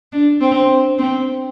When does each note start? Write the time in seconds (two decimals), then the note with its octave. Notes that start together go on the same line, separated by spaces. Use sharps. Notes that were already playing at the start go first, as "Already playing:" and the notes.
0.12 D4
0.41 C4
0.98 C4